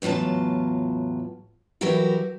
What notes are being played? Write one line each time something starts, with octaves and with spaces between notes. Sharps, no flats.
E2 A2 F#3 F4 A5
E3 F#3 E4 F#4 G4 A#4